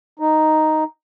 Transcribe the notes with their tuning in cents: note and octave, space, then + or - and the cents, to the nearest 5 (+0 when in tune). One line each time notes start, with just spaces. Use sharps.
D#4 +0